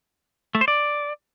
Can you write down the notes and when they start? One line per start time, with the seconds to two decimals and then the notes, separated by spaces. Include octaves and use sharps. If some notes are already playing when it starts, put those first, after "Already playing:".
0.55 A3
0.61 C5
0.68 D5